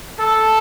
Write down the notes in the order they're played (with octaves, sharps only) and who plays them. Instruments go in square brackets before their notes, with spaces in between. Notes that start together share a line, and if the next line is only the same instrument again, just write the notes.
[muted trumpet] A4